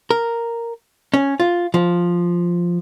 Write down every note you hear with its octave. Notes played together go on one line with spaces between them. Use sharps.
A#4
C#4
F4
F3